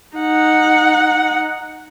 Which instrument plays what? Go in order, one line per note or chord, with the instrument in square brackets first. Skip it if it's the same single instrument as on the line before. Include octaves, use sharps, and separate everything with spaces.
[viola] D#4 F#5